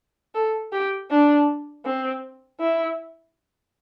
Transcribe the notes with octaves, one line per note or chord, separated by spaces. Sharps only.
A4
G4
D4
C4
E4